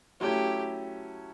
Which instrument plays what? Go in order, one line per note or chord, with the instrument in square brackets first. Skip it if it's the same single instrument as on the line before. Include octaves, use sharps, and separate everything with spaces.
[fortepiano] F#3 A3 C#4 E4 [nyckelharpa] G4